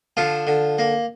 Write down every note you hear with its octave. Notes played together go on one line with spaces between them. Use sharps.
D3 F3 F4
D3
A#3